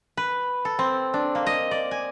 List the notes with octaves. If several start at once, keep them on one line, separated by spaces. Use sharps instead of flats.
B4
A4
C4
D4
A#3
D#5
D5
G#5